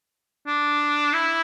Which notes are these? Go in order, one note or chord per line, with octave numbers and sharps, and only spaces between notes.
D4
E4